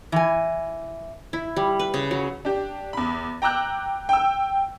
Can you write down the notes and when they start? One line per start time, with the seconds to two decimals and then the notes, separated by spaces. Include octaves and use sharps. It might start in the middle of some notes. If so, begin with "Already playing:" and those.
0.12 E3 G#5
1.33 E4
1.56 G3
1.79 B4
1.94 C#3
2.11 F#3
2.45 D4 G4
2.93 E2 B5
3.42 G5 A#5 D6 E6 F#6 G6
4.09 G5 E6